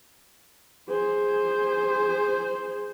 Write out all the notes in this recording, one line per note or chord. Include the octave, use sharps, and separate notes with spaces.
G#4 C5